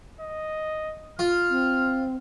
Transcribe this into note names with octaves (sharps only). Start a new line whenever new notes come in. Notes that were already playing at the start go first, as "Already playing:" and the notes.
D#5
F4 F6
C4